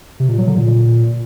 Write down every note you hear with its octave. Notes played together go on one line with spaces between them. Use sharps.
C3
A#2
F#3
D3
A#2